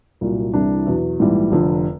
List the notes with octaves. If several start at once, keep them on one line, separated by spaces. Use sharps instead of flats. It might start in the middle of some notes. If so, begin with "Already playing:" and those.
C2 A#2 F#3
C2 C3 E3 G3 D4
E2 B2 F#3
A#1 G#2 E3 G3
F1 F2 D3